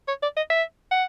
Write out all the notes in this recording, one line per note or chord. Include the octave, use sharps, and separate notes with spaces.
C#5
D5
D#5
E5
F#5